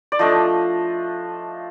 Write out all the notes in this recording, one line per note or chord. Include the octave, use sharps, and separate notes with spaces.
D5
F3 A3 D4 D#5